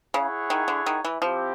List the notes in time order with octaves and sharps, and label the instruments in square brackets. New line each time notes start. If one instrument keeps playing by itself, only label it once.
[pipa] C#3 [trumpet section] E4 G#4 C#5 F#5
[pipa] D#3
D3
D#3
E3
[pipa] F3 [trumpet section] C4 E4 G4